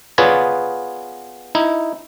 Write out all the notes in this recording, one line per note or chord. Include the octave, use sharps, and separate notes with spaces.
B3 F4 G#4 B4 C#5 D5
D#4 E4